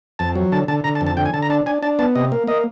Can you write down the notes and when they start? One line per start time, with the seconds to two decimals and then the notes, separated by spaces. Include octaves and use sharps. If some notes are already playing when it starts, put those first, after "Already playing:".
0.19 F2 A5
0.35 F#3
0.52 D3 A5
0.68 D3 A5
0.84 D3 A#5
0.95 A5
1.01 F2
1.07 A5
1.17 D3 G5
1.26 G#5
1.34 D3 A5
1.42 A#5
1.50 D4 A5
1.66 D4 G#5
1.83 D4 A5
1.99 B3 A5
2.15 C3 D#5
2.32 A#3
2.47 A#3 D#5